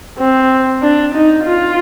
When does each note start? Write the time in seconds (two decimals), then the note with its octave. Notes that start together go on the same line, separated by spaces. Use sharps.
0.19 C4
0.82 D4
1.14 D#4
1.45 F4